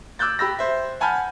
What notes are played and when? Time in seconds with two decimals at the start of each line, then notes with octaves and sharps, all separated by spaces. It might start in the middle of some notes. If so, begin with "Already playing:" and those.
0.19 D6 E6 F#6 G6 A6
0.39 G4 B5 E6 A#6
0.59 C5 E5
1.00 F#5 G#5 A5 B5 F6 G6